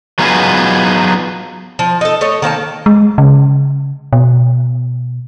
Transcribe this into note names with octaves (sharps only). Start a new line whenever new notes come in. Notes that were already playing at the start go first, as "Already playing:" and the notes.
F#3 B3 D#4 F4 G#4 B4
F3
D#4 A4
A3 C#5 D#5
D#3 A#3 C#5 A5
G#3
C#3
B2